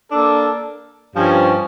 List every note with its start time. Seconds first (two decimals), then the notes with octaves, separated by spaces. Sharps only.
0.10 A#3 D4 A4
1.15 G2 F3 C#4